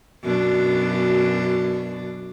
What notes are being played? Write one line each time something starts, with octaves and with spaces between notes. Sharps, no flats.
F#2 B2 D4